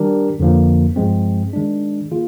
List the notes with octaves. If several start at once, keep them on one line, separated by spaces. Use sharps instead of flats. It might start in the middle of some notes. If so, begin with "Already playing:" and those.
Already playing: D#3 G3 D4 G4 A#4
F2 D3 F3 A#3
G2 F3 G#3 C4
D#3 G#3 D4
D#3 A#3 F4 G#4